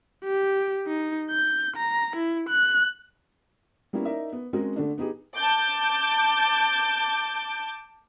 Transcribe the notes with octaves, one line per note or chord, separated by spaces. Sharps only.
G4
D#4
G6
A#5
E4
F#6
G3 A#3 B3 C#4 E4
D#4 A#4 D5 E5
B3
G#3 C4 C#4 F#4 G#4 A#4
D3 A3 D4
B3 D#4 G4 G#4
A5 D6 G6